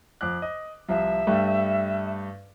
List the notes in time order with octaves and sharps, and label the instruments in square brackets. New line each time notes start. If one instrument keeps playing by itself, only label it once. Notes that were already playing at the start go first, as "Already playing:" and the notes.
[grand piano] F2 D6 F#6
D#5
[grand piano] C2 F3 [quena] E5
[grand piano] G2 G3 A3